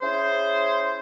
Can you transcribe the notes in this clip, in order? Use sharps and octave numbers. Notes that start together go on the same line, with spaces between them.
C#4 E4 G#4 C5